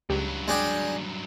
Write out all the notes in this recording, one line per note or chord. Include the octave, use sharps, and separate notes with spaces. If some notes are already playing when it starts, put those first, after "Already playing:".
C#2 G2 F#3 G4
G#3 D4 G5